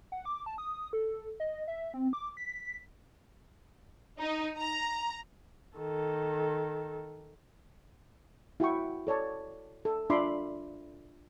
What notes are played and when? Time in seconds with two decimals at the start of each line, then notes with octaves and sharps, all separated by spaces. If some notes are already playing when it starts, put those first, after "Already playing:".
0.12 F#5
0.25 D6
0.46 A5
0.58 D#6
0.93 A4
1.40 D#5
1.68 E5
1.94 C4
2.13 D6
2.37 B6
4.20 D#4
4.60 A#5
5.77 D#3 A4
8.60 E4 F#4 G5 C#6
9.07 A4 C#5 D5 A5
9.85 A4
10.10 D4 F4 E5 B5 C6 D6